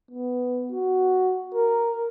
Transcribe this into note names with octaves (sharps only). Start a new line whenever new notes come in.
B3
F#4
A#4